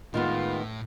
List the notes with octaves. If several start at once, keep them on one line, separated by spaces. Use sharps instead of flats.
A2 D#3 G#3 B3 F4